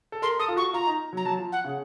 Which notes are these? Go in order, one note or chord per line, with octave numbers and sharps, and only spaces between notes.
A4
A#4 C6
A4 D#6
F4
F#4 C#6
F4 A#5
D#4
F#3
A#5
F#3 A5
F3
F#5
C#3